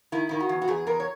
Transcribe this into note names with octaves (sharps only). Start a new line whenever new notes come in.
D#3 E4
D#3 E4
F#4
E2
F#4
E2 G#4
E2 A#4
C#5